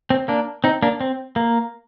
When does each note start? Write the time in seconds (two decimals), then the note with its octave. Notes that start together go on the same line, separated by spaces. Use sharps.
0.10 C4
0.28 A#3 D4
0.64 C4 D#4
0.83 A#3 D4
1.01 C4
1.36 A#3